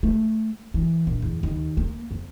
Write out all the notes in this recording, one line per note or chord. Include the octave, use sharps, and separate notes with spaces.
A3
E3
A#1
E2
D#2
A#3
F2